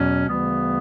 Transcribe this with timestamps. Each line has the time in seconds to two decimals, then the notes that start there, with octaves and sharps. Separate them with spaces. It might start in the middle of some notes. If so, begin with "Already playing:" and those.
Already playing: E2 B2 F#3 C#4
0.27 D2 C#3 E3 G3 B3